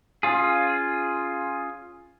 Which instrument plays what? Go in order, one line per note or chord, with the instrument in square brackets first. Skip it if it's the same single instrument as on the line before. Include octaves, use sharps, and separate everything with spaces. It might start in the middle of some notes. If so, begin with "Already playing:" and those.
[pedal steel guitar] C#4 F4 G#4